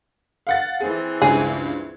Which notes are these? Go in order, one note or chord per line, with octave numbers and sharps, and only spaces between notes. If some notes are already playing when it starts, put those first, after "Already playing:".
F5 F#5 A6
E3 C4 G#4
C#2 G2 G#4 G#6